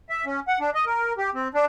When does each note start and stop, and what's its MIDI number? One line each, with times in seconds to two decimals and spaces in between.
0.09 0.25 76
0.26 0.40 61
0.48 0.59 78
0.60 0.70 62
0.74 0.85 75
0.86 1.13 70
1.18 1.30 67
1.34 1.48 60
1.54 1.65 62